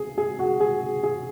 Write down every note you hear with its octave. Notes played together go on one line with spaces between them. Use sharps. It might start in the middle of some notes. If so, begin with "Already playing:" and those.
Already playing: G#4
G#4
F#4
G#4
G#4